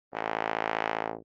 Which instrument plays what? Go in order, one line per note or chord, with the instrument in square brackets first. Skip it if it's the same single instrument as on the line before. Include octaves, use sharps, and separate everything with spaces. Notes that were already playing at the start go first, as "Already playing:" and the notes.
[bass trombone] A1